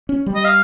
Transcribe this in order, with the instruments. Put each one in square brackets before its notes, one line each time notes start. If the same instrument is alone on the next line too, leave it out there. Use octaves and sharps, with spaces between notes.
[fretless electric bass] C#4
G3
[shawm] D#5
F5